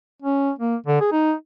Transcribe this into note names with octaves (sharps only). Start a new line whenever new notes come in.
C#4
A#3
D3
G#4
D#4